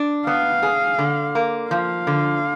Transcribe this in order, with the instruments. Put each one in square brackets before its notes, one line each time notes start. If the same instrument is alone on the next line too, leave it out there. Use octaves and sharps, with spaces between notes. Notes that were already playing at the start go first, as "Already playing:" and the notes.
Already playing: [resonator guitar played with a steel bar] D4
[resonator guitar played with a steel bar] B3 [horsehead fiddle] F5
[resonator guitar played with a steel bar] G#4
D3
A#3
[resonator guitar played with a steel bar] F3 [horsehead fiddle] F5
[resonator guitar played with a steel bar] D3